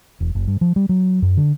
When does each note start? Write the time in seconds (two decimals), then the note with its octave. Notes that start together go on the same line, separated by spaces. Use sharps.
0.20 E1
0.35 F#1
0.48 G2
0.61 F3
0.76 G3
0.89 F#3
1.22 F#2
1.37 D3